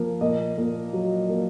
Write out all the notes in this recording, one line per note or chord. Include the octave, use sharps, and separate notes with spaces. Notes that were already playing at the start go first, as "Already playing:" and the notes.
Already playing: F3 A#3
A#2 D#5
A#2
F#3
A#3